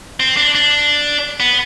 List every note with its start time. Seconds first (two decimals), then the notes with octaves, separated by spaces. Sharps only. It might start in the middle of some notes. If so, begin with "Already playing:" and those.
0.20 C4
0.37 D4
0.55 D4
1.40 B3